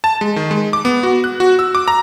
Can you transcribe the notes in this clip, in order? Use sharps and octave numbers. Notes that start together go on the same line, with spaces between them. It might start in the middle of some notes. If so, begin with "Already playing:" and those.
A5
G#3
D#3
G#3
D6
B3
F#4
F#6
F#4
E6
D6
A#5